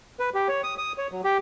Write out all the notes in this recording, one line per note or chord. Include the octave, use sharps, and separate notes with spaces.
B4
G4
C#5
D#6
D#6
C#5
F#3
G4